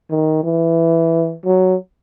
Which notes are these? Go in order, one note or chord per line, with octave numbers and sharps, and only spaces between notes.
D#3
E3
F#3